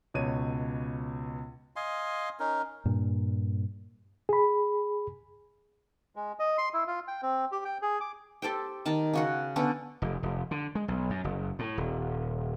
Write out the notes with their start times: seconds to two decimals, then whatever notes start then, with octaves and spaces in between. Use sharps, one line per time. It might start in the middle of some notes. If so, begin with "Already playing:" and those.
0.14 C#2 B2 C#5 D#7
1.76 D#5 F5 G#5 C6
2.40 C#4 D#4 A#4
2.85 G2 A#2
4.29 G#4 B5
6.16 G#3
6.39 D#5
6.58 C6
6.73 E4
6.87 F4
7.08 G5
7.22 C4
7.52 G4
7.65 G5
7.82 G#4
8.01 D6
8.42 G4 A4 C5 G5
8.86 D#3 A5
9.13 C#3 F#4 F#5
9.56 D3 B3 C#4 A4
10.02 F1
10.23 F1
10.51 D3
10.75 G#3
10.88 B1
11.10 F#2
11.24 F#1
11.59 A2
11.78 D#1